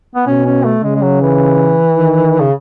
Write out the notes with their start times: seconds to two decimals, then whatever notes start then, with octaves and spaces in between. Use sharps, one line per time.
0.15 B3
0.27 B2 C#4
0.45 C#4
0.65 A3
0.83 C#3 G#3
0.96 G#3
1.02 F#3
1.21 E3
1.96 D#3
2.40 C#3